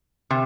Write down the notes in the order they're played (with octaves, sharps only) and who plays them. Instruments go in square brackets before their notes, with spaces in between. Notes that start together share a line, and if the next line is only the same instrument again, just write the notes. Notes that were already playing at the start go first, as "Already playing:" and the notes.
[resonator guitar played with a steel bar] C3